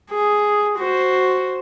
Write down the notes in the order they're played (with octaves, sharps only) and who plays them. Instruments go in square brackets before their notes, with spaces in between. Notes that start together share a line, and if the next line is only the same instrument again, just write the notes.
[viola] G#4
F#4 C5